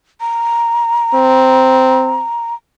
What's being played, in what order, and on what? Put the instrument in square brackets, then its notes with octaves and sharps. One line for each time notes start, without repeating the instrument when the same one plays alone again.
[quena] A#5
[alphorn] C4